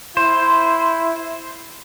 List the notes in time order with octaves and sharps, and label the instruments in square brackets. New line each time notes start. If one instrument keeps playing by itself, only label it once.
[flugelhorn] E4 [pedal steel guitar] C5